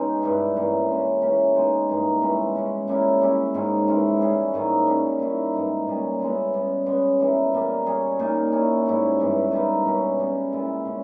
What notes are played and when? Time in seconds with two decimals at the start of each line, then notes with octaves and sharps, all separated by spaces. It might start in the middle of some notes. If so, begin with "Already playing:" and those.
Already playing: B2 G#3 C#4 D#4 G4
0.22 G2 G3 B3 E4
0.54 G2 E3 A#3 C#4
0.88 C#3 G#3 C#4
1.22 E3 A#3 C#4 G4
1.54 B2 G#3 D#4
1.88 G2 E3 A#3 D#4
2.21 B2 G#3 C#4 E4
2.55 C#3 G#3 C#4
2.88 C#3 G3 A#3 E4
3.21 G3 C#4 E4
3.54 G#2 D#3 G#3 C#4
3.87 E3 G#3 C#4 E4
4.20 G3 C#4 G#4
4.54 G#2 D#3 A#3 E4
4.86 G3 C#4 G4
5.20 D#3 A#3 E4
5.53 G#2 E3 G#3 D#4
5.87 A#2 G3 C#4 G#4
6.19 C#3 G#3 B3 E4
6.53 C#3 G3 B3
6.86 C#3 G#3 B3
7.20 E3 G3 A#3 E4
7.53 A#2 G3 A#3
7.86 G3 C#4 G#4
8.19 A#2 A#3 D#4
8.52 G3 C#4 E4
8.86 G#2 G3 C#4 E4
9.19 G2 E3 G3 B3
9.52 D#3 A#3 E4 G4
9.85 B2 A#3 C#4
10.18 C#3 G3 B3
10.52 A#2 G#3 B3 E4
10.85 C#3 G3 C#4